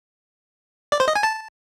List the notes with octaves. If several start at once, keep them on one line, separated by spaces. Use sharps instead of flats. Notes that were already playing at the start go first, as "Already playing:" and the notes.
D5
C5
D#5
G#5
A5